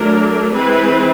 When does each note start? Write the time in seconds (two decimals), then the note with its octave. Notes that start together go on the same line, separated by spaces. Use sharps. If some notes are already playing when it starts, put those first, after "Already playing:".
Already playing: F#3 A3 D4 A#4
0.53 E3 G#3 C4 B4